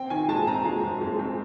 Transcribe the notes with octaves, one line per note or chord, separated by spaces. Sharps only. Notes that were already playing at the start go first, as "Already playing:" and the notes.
Already playing: C4 G5
D#3 G#5
G#3 A5
C4 A#5
G#3
F#2
G#3
C4